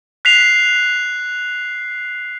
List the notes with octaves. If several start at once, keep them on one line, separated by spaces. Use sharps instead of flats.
F#6 B6 C7 F7